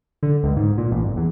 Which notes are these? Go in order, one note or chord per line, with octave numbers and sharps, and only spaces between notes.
D3
C#2
G#2
A#2
A1
G1
E2